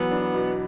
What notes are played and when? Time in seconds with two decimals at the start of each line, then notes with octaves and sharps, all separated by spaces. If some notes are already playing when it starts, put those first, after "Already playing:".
Already playing: E3 F#3 B3
0.11 D4
0.34 B2